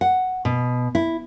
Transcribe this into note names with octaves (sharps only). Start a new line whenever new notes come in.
F#5
B2
E4